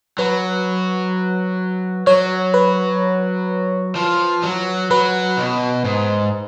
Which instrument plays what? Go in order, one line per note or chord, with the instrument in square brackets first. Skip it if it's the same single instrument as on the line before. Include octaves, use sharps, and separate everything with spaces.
[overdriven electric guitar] F#3 [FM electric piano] B4
[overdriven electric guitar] F#3 [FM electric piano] C#5
[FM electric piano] B4
[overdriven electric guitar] F3
F#3
[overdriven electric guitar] F#3 [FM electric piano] B4
[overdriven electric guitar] B2
G#2